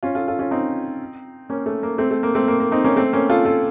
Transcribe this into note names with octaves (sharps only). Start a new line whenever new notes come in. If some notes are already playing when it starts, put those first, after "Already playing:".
C#4 F4
F4 A4
F4 A4
C#4 F4
C4 D#4
A#3 C#4
A3
A#3
A3 C4
A3
A#3
A3 C4
A#3
A#3
C4 D#4
A#3 C#4
A3 C4
A#3 C#4
F4 A4
F4 A4